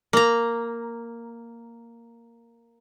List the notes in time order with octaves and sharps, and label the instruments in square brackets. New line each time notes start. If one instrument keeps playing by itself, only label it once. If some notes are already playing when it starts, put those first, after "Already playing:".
[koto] A#3 A#5